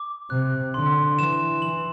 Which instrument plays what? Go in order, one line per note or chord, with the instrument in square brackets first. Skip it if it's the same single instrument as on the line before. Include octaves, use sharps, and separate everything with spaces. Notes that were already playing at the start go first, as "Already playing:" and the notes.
Already playing: [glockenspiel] D6
[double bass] C3 [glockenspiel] F#6
[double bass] D3 [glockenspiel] C6
[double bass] E3 [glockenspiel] E7
[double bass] E3 [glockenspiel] F#7